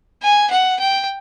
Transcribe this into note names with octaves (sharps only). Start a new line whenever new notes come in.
G#5
F#5
G5